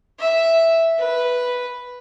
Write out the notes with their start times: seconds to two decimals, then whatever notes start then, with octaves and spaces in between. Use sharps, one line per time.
0.19 E5
0.99 B4